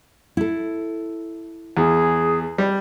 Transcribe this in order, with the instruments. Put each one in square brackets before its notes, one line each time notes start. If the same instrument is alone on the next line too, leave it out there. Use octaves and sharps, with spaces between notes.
[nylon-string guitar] E4 A4
[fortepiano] E2 [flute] G#4
[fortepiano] G3